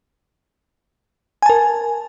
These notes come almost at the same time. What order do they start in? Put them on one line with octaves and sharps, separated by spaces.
G#5 A5 A#4